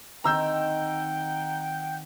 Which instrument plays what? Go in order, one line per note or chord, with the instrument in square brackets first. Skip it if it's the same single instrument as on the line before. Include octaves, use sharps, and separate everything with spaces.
[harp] D#3 C4 [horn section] F#5 G5 [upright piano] A#5 E6 G6